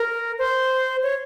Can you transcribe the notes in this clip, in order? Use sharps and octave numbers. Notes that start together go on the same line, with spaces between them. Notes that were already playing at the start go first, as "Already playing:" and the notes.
Already playing: A#4
C5
C#5